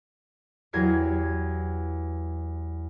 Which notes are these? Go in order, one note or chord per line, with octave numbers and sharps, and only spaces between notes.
E2 F#3 G4 G#6 A#6 C7